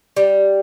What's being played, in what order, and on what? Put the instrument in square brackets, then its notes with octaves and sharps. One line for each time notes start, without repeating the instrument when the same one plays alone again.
[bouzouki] G3